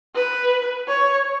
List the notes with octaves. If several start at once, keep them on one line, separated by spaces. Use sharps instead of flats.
B4
C#5